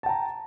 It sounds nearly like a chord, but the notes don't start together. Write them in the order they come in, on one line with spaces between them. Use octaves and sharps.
A5 G5 A#5